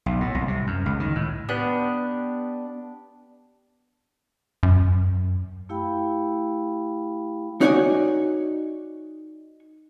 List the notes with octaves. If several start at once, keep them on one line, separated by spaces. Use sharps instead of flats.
B1
A2
C2
C3
F#2
C#2
D#3
A2
B3 D4 G4 F#6
F#2
A3 E4 G4 F5 G5 B5
D#4 F#4 C#5 D5 F#5 G#5